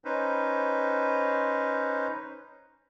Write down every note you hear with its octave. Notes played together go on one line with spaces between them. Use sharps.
C#4 D#4 B4 C5